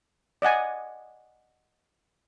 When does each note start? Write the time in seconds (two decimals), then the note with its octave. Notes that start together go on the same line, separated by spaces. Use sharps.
0.42 D5 D#5 F#5 G#5